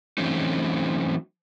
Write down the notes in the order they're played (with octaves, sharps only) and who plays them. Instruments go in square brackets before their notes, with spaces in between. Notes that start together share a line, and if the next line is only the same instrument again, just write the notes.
[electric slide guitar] E3 F#3 A3 C4 C#4 D#4